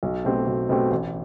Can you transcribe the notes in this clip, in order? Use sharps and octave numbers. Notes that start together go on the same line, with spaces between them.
B1
B2 A3 C4 G4
B1
B2 A3 C4 G4
A1